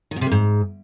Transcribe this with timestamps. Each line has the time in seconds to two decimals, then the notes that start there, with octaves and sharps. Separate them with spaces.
0.11 D#3
0.16 B2
0.21 C3
0.26 A#3
0.32 G#2